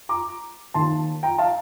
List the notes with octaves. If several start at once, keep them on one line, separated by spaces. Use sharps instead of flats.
A#5 D6
D#2 D#3 A#3 A5 C6
G5 A#5
F5 A5